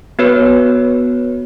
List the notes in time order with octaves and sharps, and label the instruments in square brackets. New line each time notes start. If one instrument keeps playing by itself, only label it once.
[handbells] B3 F#4 B4 C#5